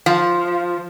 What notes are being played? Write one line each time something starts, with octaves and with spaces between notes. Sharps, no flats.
F3